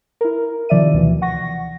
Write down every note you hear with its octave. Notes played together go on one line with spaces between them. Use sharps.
E4 A#4
C3 D#3 F3 D5 E5 D#7
D2 B2 E3
F#5 C#6 A#6